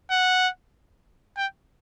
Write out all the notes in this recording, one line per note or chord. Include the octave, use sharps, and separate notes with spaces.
F#5
G5